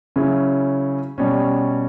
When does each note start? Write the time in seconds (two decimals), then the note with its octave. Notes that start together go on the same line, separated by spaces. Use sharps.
0.16 C#3 F#3 C#4 E4
1.18 B2 G3 C#4